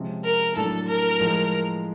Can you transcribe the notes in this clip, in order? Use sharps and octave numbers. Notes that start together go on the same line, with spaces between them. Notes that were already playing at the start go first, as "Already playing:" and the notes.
Already playing: C3 F3 G#3 C#4
A#4
A2 F#3 A3 D4 A4
A#4
A2 F3 G#3